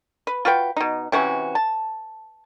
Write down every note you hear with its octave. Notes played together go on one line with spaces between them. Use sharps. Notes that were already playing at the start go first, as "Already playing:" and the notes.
B4
F4 F#4 B4 G5
B2 D#4
C3 E3 C#4 F#4
A5